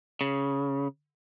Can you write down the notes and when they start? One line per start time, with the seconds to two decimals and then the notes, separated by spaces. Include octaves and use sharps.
0.21 C#3